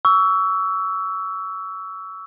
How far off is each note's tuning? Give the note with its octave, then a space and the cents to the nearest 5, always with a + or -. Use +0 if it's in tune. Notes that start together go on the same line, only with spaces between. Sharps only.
C#6 +30 E6 +0